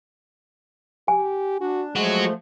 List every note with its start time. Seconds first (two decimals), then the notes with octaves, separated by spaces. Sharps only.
1.08 G4 G#5
1.61 D4 F#4
1.96 F3 F#3 G#3 A3 F#4